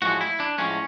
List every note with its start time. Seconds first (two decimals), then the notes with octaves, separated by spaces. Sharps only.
0.02 A2 F3 G#3 F#4
0.21 E4
0.40 D4
0.58 A2 F3 G#3 C#4